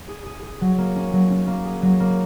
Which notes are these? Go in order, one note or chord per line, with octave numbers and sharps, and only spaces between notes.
G#4
G#4
G#4
F#3
A#3
C#4
F#3
C#4
A#3
G#4
F#3
A#3